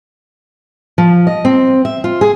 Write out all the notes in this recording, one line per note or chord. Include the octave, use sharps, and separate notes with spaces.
F3
D#5
C4
E5
F4
G#4